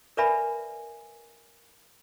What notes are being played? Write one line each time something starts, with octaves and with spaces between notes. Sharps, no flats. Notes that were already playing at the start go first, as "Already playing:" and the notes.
A#4 B4 D5 E5 G#5 B5